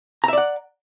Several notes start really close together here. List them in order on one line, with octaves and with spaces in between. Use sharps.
A#5 E5 D5 F#5